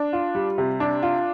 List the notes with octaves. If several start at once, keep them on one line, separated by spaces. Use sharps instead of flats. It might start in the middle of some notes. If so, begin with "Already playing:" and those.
Already playing: D4
F4
G3
C3
D4
F4